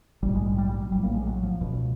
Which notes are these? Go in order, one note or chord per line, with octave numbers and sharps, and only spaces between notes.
A#1 G#2 G3
G#3
G3
G3
G3
F#3
A#1 A2 G3
A#3
G#3
F#3
F3
C#2 B2